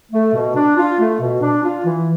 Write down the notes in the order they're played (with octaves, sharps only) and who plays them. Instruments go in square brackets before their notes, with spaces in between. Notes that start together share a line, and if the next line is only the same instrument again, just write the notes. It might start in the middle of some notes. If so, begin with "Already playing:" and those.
[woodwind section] A3
B2
D4
F4
A3
B2
D4
F4
E3